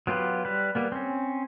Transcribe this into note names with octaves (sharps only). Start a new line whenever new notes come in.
F#3 B3 F4 G4 B4
G3 B4
G3 A#3 B3
C4 C#4